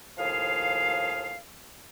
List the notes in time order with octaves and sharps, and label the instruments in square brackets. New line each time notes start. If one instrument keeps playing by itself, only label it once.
[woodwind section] D#2 A2 F3 G#4 F5